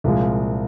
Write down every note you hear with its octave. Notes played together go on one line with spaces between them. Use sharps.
C2 A#2 F3 G#3